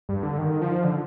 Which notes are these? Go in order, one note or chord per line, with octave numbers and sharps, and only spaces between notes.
G2
D3
D#3
F3
D3